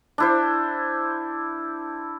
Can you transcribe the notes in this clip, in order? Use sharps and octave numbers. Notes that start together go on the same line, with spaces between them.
D4 E4 C5